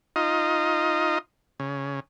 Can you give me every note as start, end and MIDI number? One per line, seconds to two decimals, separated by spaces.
0.16 1.18 63
0.16 1.18 65
0.16 1.18 75
1.60 2.00 49